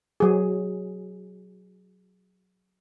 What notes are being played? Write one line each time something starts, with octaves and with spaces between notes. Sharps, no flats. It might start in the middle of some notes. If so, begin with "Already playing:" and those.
F#3 G#4